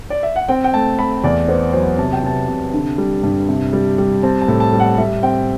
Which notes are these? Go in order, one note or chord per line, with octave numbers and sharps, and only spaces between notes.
D5
E5
F#5
C4 G5
G5
A3 A5
A3 B5
E2 D5
B3 C5
F#3 C5
C3 A5
G5
C3 A5
C3
D3
G3
G2
C3
G3
G3
C4 A5
A5
A2
A5
G3
F#5
G3 E5
C4 G5